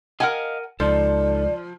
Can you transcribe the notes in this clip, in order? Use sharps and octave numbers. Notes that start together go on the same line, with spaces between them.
A#4 D#5 F5 F#5 G#5
C#2 F3 D#4 A4 D5